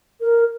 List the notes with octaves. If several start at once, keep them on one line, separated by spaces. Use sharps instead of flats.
A#4